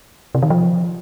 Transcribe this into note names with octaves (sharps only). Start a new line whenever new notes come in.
C3
D#3
F3